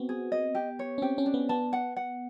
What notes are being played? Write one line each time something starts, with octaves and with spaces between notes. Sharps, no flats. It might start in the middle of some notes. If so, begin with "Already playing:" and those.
Already playing: B3 C4 F#4
G#4
D#5
G4
C#5
C#4
C4 G4
C#4
D4
B3
B3 A5
F#5
F#5